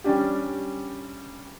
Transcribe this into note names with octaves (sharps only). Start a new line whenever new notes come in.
G3 C#4 D4 G4